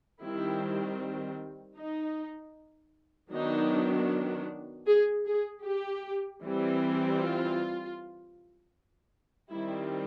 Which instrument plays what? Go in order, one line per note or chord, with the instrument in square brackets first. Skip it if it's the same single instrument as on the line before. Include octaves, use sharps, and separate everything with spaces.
[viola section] D#3 G3 C4 E4
D#4
D#3 F#3 B3 D4 D#4
G#4
G#4
G4
E3 G3 C4
F4
D#3 G3 C4 E4